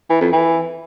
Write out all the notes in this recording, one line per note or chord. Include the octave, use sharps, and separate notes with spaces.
E3
F2
E3